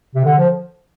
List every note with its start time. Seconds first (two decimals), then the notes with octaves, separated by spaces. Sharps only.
0.15 C3
0.25 D3
0.38 F3